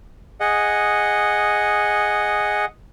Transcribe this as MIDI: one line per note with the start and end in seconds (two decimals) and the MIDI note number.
0.40 2.65 68
0.40 2.65 75
0.40 2.65 78